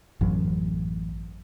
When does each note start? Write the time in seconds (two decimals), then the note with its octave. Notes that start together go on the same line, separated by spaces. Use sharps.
0.21 A1 F#2